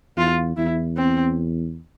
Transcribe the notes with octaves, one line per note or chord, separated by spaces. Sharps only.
E2 F4
E2 E4
C4